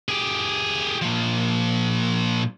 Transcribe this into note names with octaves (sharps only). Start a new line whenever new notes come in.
G4 G#4
A#2 F3